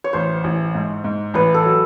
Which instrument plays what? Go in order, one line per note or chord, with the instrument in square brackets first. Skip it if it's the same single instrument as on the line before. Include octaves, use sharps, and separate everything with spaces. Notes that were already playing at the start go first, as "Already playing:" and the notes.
[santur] C#5
[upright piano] A1 [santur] C5
[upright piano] A1
G#2
G#2
[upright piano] A1 [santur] B4
[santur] A4
[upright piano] F#3